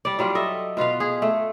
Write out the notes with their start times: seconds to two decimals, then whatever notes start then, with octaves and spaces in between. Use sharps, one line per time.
0.05 G3 D5
0.19 F#3 G3 F4 D5
0.35 A4 D#5 E5
0.77 B2 F4 B4 F5
1.00 G#4
1.22 A3